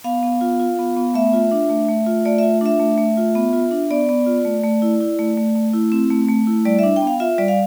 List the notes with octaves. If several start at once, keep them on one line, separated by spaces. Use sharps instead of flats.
B3 F5
B3
F4
F4
B3
B3
A3 E5
F4
D4
A3
A3
F4
A3 D5
F4 E5
D4 E5
A3
A3
F4
B3
F4
D4
B3 D5
B3
F4
A3
A3
E4
E4
A3
A3
A3
E4
C4
A3
A3
E4
G3 D5
D4 E5
G5
B3
F5
F4 E5
G3 D5
F5